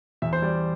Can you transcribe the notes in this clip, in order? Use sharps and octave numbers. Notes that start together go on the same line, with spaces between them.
E2 E5
C5
G3 D5